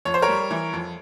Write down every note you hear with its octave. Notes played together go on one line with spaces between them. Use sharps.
F2 C#5
C5
A#4 C#5
G3
E3
F2